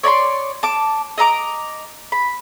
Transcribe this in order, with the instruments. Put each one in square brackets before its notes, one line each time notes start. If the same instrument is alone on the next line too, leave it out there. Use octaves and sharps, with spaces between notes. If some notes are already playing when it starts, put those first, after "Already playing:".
[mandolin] C#5 D5 B5 C6
A5 D6
D#5 E5 A#5 D6
B5